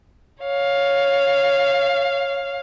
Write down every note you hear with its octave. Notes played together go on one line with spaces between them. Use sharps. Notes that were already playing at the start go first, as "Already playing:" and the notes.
C#5 F5